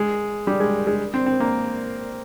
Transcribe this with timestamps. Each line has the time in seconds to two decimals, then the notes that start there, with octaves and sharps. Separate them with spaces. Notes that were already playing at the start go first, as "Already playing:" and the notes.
Already playing: G#3
0.47 G3
0.60 G#3
0.87 G#3
1.14 C4
1.26 C4
1.40 A#3